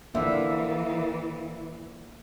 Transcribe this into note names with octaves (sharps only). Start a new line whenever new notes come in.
D3 E3 F3 A#3 B3 E5